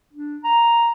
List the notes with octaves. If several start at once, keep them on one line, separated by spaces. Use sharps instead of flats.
D4
A#5